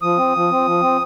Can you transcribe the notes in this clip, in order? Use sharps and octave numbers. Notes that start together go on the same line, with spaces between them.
F3 D#6
C4
F3
C4
F3
C4